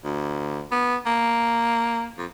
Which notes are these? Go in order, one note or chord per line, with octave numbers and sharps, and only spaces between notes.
D2
B3
A#3
F2